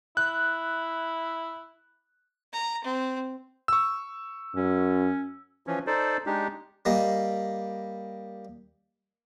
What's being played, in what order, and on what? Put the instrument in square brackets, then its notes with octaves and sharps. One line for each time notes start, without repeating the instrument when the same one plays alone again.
[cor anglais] E4 [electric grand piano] F#6
[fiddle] A#5
C4
[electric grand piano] C#6 E6
[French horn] F#2 [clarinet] C#4
[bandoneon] E3 F3 C#4
D#4 A4 C5 D5
G#3 D4 D#4 G4
[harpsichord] G3 A#3 D#5